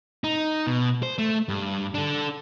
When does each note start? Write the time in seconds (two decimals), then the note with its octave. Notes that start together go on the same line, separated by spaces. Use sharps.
0.24 D#4
0.67 B2
1.03 C5
1.18 A3
1.49 G2
1.94 D4 A4